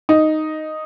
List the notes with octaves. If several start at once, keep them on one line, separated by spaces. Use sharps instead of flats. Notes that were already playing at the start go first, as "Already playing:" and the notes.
D#4